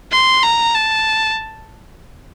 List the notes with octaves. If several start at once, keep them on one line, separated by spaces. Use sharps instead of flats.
C6
A#5
A5